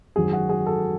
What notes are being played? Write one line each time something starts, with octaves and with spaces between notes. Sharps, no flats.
G#1 F#2 D#3 F#3 G#4
F#4
G#4
A4